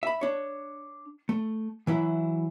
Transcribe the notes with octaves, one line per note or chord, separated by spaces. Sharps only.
E5 B5
D4 C#5
A3
E3 F#3 E4